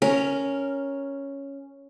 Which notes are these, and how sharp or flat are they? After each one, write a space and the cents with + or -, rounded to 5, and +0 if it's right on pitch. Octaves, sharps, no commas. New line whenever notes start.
C#4 +0 A#4 +0